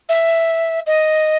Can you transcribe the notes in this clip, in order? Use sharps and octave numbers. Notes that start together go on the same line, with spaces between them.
E5
D#5